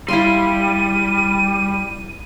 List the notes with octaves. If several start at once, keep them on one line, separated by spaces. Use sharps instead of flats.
G3 E4 F5 C6 D#7